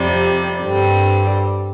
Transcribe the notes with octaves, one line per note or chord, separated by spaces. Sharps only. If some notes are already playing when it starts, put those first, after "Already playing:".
Already playing: F2 C3 G3
G2 D3 G3 C4